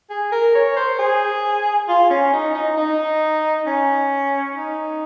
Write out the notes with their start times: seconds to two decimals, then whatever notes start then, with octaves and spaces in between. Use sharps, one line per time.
0.10 G#4
0.32 A#4
0.55 C#5
0.77 C5
0.99 G#4
1.88 F4
2.10 C#4
2.33 D#4
2.55 D#4
2.77 D#4
3.66 C#4
4.55 D#4